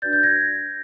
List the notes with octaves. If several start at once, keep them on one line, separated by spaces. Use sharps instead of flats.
D4 F#4 B4 D5 G6 A6
G6 A6
G#6 A#6